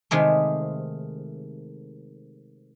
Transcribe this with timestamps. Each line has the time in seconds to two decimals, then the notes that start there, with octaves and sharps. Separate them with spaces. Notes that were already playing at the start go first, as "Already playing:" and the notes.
0.11 C3 D#3 G#3 A3